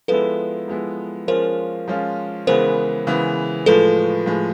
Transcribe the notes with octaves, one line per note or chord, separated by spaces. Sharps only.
F3 G#3 B3 E4 A4 B4
F3 G#3 B3 E4
F3 G#3 C#4 F4 A#4 C5
F3 G#3 C#4 F4
C#3 E3 G#3 B3 A#4 C5
C#3 E3 G#3 B3
A2 F3 G#3 A4 B4
A2 F3 G#3